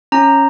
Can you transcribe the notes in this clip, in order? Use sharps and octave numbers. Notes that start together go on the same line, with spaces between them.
C#4 A#5